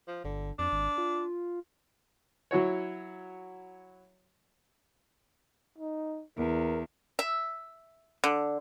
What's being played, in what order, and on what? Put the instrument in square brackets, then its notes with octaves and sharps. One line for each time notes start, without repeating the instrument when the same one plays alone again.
[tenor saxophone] F3
[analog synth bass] G1 [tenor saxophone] D3
[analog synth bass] F2 [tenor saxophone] D4
[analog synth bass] G#1
F4
[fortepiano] F#3 E4 F#4 C#5
[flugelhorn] D#4
[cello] E2 [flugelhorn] A#4
[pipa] E5
D3